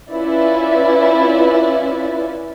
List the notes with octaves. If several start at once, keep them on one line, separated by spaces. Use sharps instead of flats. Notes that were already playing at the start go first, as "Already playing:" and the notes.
C#4 E4 F4 B4 D5